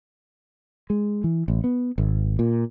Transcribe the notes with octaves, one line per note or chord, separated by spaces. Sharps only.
G#3
E3
A1
B3
G#1
A#2